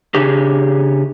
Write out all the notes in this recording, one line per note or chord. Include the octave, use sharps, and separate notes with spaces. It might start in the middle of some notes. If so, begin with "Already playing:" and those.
C#3 D4 G4 G#4